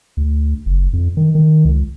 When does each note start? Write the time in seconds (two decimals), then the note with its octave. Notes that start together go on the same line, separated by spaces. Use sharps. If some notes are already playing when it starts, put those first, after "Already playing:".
0.17 D2
0.66 F#1
0.93 F2
1.17 D#3
1.35 D#3
1.65 C#2